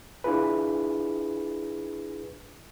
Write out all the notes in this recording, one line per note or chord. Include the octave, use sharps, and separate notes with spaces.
D4 E4 F4 G#4 B4